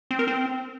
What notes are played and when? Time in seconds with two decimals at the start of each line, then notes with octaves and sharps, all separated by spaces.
0.11 C4
0.19 A#4
0.28 C4